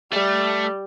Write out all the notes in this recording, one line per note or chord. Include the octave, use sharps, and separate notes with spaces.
G3 A3